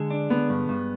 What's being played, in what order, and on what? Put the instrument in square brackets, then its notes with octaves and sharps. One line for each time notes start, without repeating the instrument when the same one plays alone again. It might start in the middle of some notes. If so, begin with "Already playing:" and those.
Already playing: [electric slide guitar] D3 [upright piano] G#3
[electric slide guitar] D4
[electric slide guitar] D3 [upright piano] B3
[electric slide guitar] G2
G2